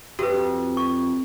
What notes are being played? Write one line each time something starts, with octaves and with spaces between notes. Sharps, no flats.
F2 F#4 G4 B4
C#6